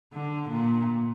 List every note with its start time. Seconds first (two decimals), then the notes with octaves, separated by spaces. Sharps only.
0.13 D3
0.50 A#2